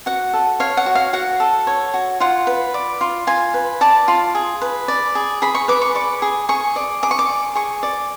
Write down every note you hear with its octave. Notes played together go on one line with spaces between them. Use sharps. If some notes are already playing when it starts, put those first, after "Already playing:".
F#4 F#5
A4
C#5 F5
F#5
F#4
F5
F#4 F#5
A4
C#5
F#4
F4 F#5
B4
D5
F4
F4 G#5
B4
D5 A5
F4
G#4
B4
D5
G#4
G#4 B5
C#6
B4 D6
C#6
D5 C#6
G#4
G#4 C#6
D5
G#4 D6
C#6
D6
D5
G#4 C#6
D5